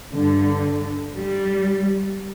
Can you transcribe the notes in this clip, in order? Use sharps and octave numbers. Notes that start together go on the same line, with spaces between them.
G2 D3
G3